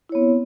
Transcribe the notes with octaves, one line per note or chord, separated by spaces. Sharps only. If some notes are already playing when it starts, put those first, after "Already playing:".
B3 C4 E4 C#5